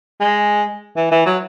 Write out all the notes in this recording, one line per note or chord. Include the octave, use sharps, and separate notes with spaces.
G#3
E3
E3
F#3